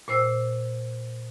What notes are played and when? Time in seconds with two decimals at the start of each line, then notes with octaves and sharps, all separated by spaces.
0.08 A#2 C5 E6